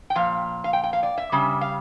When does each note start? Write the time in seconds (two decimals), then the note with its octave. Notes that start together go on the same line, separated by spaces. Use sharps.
0.10 G5
0.16 A#2 F3 F5
0.64 F5
0.73 G5
0.83 G5
0.93 F5
1.03 D5
1.18 E5
1.32 C#3 G3
1.61 F5